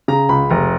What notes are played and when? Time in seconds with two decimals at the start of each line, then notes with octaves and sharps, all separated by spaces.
0.08 C#3 A#5
0.29 C#2 B5
0.50 F1 A#5